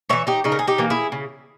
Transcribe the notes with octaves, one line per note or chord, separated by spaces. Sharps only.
E3 A#3 C#5 E5
D#4 G4
C#3 D#4
A#4
G#4
D#4 G4
E3 A#3
E4 G#4
C#3